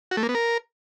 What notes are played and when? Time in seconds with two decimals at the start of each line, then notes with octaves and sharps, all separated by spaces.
0.11 F#4
0.17 A3
0.23 A#3
0.29 B3
0.35 A#4